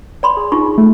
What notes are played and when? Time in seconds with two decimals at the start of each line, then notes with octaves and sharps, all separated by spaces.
0.23 D5 B5 C6
0.37 G#4
0.52 D#4 F4 C#6
0.78 A3